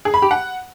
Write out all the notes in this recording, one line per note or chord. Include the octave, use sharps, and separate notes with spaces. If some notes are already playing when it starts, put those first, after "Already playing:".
G#4
B5
G4
F#5